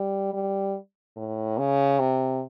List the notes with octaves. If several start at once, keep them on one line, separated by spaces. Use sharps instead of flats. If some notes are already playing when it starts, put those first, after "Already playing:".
Already playing: G3
G3
A2
C#3
C3